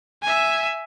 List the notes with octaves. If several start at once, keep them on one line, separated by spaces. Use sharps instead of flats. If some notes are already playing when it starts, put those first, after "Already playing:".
E5 G#5